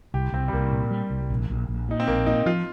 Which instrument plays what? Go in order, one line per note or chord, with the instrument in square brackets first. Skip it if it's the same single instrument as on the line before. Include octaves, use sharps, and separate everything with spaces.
[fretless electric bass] C2 [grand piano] G4
[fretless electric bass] C2 [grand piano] C4
[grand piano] G3
[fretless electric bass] C2 [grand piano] A#3
[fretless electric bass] A#2
G3
C2
A#1
A#1
A#1
[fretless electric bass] A#2 [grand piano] D#4
[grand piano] C4
[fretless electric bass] A#1 [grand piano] A#3
[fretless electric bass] A#2 [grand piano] D#4
[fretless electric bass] F3 [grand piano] F4